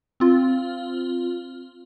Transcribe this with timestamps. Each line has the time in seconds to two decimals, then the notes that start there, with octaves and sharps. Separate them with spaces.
0.20 C4 F4